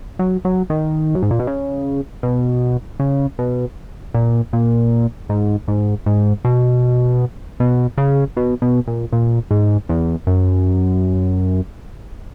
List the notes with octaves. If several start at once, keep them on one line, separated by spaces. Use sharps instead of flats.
F#3
F#3
D#3
F#2
G#2
A#2
B2
C#3
B2
C#3
B2
A#2
A#2
G#2
G#2
G#2
B2
B2
C#3
B2
B2
A#2
A#2
G#2
E2
F#2